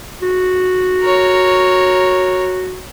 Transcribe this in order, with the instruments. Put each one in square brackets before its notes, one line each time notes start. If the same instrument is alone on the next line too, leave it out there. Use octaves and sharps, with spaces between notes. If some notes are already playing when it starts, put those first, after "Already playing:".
[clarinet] F#4
[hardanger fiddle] A#4 C#5